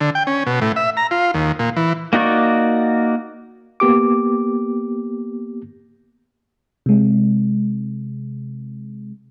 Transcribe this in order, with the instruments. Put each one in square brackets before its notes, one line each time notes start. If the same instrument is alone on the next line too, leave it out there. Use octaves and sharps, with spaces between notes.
[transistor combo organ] D3
G5
C#4
B2
A2
E5
A#5
F4
D#2
A#2
E3
[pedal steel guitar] A#3 D#4 F#4 D5 C#6
[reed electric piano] A#3 B3 G4 D6
[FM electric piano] C3 G#3